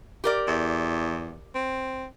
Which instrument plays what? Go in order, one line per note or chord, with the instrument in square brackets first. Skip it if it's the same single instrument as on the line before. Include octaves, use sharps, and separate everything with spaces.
[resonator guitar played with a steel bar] G4 A#4 D5
[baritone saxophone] E2
C4